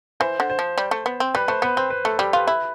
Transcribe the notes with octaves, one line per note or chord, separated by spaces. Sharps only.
E3 C5
D3
C5
F3
G3
A3
B3
C4
G3 B4
A3 C5
B3 B4
C4 C5
B4
A3 A4
G3 G4
F4 B4
E4 B4